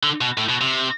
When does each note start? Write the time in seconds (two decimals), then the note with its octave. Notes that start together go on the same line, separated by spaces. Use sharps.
0.03 D3
0.21 B2
0.38 A2
0.49 B2
0.61 C3